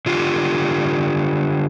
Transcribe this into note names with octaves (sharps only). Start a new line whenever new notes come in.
D3 F4 G4